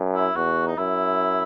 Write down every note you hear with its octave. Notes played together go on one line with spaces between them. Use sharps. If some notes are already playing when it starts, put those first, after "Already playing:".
Already playing: F#2
E4
E2 F#4
D#4
F#2 E4